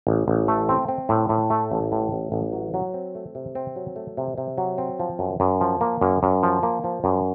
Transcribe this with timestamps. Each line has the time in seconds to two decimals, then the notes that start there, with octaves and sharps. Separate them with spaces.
0.07 A1
0.28 A1
0.48 A3
0.69 C4
0.88 C4
1.09 A2
1.29 A2
1.50 A3
1.72 A1
1.92 A2
2.12 A1
2.32 A1
2.53 F#3
2.74 F#3
2.94 C4
3.15 A3
3.35 C3
3.55 C4
3.76 F#3
3.96 A3
4.17 C3
4.38 C3
4.58 F#3
4.78 C4
4.99 F3
5.19 F#2
5.40 F#2
5.61 F3
5.81 A#3
6.01 F#2
6.23 F#2
6.43 F3
6.63 A#3
6.84 F3
7.04 F#2